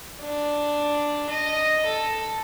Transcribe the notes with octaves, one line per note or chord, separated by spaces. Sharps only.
D4
D#5
A4